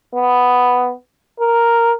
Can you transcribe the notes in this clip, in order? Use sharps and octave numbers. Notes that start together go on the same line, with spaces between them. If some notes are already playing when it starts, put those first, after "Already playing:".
B3
A#4